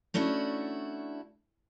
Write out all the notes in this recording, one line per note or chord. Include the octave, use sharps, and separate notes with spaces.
A3 C#4 D4 E4 F#4